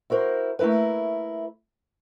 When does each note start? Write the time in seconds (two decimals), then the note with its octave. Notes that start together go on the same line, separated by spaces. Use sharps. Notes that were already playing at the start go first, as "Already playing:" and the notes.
0.10 E4 F#4 A#4 C5
0.59 A3 A#3 E4 A#4 B4